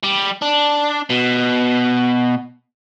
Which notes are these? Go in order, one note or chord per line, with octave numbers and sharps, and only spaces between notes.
G3
D4
B2